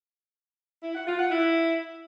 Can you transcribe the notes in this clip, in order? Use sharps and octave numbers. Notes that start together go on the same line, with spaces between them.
E4
F#5
F4
F#5
E4